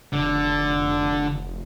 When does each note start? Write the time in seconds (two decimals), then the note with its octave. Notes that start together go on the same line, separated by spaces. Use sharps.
0.13 F1 D3